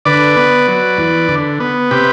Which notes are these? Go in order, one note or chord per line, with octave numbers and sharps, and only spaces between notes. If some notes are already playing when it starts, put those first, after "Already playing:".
D3 B4 D5
B3
F#3
E2
D3
B3
C3 G4 B4